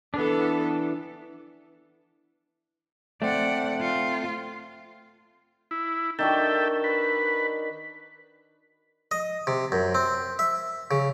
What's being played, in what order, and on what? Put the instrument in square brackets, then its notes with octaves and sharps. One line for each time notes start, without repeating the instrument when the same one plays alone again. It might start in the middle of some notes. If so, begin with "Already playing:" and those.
[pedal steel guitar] E3 D4 [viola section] B3 A4
[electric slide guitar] A3 C4 [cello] D5 F#5
[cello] F4
[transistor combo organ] E4
[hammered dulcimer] D#3 D4 F#4 [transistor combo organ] A4 E5 G5
[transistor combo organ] B4
[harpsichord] D#5
C3
F#2
C4
E5
C#3